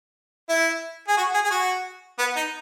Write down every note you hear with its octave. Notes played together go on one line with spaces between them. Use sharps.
E4
G#4
F#4
G#4
G#4
F#4
B3
D#4